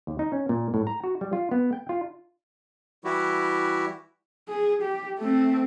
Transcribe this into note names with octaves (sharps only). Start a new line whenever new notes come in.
D#2
D#4
C#4
A#2
A2
A#5
F#4
G3
F4
B3
G5
F4
E3 G3 E4 F#4 G4
G#4
G4
A3 C4